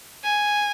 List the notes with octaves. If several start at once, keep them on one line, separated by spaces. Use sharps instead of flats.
G#5